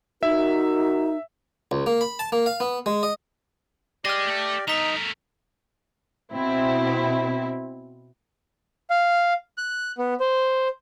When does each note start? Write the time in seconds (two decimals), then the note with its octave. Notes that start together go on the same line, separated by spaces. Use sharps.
0.23 D#4 F#4 A#4 E5
1.71 C#2
1.86 A#3
2.01 B5
2.19 A5
2.32 A#3
2.46 F5
2.60 B3
2.86 G#3
3.03 D#5
4.05 G4 G#4 D5 D#5 F6 A#6
4.26 A3 A4
4.68 A3 D#4 A#4 B6 F7
6.33 B2 C4 E4
8.90 F5
9.58 F#6
9.98 B3
10.20 C5